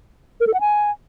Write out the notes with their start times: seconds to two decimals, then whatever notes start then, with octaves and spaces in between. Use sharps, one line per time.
0.40 A#4
0.47 A4
0.54 F#5
0.60 G#5